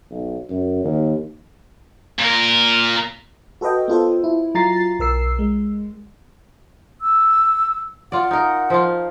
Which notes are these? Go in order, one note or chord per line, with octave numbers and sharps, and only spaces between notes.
B1
F#2
D#2
A#2 A#4
F#4 A4 B4 D#5 G5
B3 F4 A4 C5
E4
F#3 F4 A#5 A6 C7
B1 A#4 E6 C7
G#3
E6
F4 D5 F#5
D#4 A#4
F3 F4